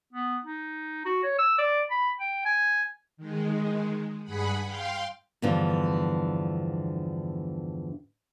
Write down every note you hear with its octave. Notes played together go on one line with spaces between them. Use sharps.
B3
D#4
F#4
C#5
E6
D5
B5
G5
G#5
D#3 G#3
G2 G#4 F#5 B5
F5 G5 C6
E2 G2 D3 E3 F3